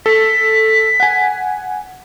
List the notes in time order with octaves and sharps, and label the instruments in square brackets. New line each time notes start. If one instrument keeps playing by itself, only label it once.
[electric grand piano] A4 [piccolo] B6
[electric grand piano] F#5 G#5